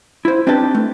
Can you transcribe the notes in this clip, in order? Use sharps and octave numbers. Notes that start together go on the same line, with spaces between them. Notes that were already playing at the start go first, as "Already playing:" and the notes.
E4 C5
C4 D4 D#4 G4 B4 A5
A3